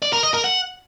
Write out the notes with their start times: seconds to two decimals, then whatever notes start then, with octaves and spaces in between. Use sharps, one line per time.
0.02 D5
0.13 A#4
0.23 D#5
0.34 A#4
0.44 F#5